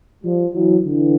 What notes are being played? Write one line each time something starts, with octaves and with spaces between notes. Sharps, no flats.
F3 G3
E3 F#3
D3 E3